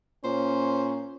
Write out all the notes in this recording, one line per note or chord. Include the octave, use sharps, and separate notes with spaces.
A#2 C#4 C5